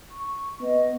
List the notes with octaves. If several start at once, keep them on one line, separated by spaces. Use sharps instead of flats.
C#6
B3 D#5